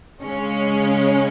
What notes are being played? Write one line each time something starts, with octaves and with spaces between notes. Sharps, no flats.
C#3 G#3 C#4